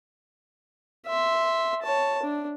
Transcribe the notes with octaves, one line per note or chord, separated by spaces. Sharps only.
E5 C6
C#5 A5
D4